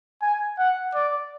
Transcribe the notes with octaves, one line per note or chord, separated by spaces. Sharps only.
G#5
F#5
D5